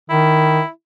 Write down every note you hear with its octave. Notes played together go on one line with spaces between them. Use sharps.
D#3 E4